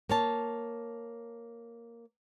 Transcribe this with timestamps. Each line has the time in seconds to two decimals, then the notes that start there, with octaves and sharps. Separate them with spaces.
0.09 A#3 C#5 A5